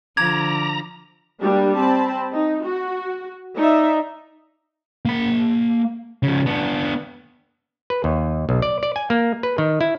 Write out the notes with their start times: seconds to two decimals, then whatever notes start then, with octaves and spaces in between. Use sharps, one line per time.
0.17 D3 F3 A#5 D6 G#6
1.41 G3 A#3 D4 G4
1.76 C4 A5 B5
2.34 D#4
2.64 F#4
3.56 D#4 D5 E5
5.05 A#3 B5
6.23 C#3 F3
6.46 B3 D4
7.90 B4
8.04 D#2
8.49 B1
8.62 D5
8.83 D5
8.96 G#5
9.10 A#3
9.43 B4
9.58 D#3
9.81 E4